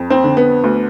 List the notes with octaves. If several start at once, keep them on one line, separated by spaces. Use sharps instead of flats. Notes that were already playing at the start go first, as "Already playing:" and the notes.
Already playing: F2
C4
D3
B3
D2